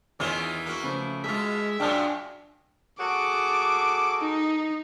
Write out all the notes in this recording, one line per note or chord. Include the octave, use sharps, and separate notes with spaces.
E2 D#3 E3 C#4 F4 G#4 G7
A#3 F#4
C#3 F3 A3
B2 G#3 F4 G#4 E5
F#2 A#2 F#3 D4 G5 A5 F6
F#4 G#4 A4 D6
D#4